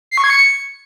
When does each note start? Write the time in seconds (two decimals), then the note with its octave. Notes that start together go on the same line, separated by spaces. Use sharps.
0.11 C7
0.18 C#6
0.24 G#6
0.30 C#7